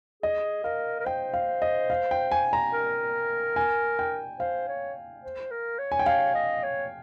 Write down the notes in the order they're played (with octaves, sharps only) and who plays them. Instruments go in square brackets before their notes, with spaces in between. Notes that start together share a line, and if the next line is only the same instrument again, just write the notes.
[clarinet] G#4 [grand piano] D#5
[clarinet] A#4 [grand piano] F5
[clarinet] A#4
[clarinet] C5 [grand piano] G5
[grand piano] F5
D#5
F5
G5
G#5
A#5
[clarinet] A#4
[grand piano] G#5
G5
[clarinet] C5 [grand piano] F5
[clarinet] C#5
C5
A#4
C#5
[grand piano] G#5
G5
[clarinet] C#5 [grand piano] F5
[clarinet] D#5
C#5